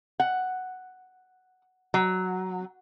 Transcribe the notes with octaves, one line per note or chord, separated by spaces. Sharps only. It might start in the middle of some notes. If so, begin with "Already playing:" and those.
F#5
F#3